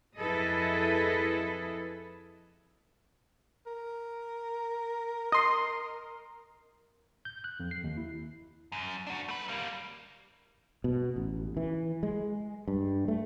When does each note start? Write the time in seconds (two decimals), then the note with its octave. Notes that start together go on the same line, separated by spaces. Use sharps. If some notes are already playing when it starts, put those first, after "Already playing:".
0.17 F2 E4 G#4 A4 B4 D#5
3.67 A#4
5.32 D#5 C6
7.25 G6
7.44 F#6
7.60 F2
7.71 C7
7.84 D#2
7.97 E4
8.72 F#2
9.07 D4 F#4
9.28 A3 B4
9.49 G3 A#3
10.84 B2
11.16 A1
11.57 E3
12.03 G#3
12.68 G2
13.08 A3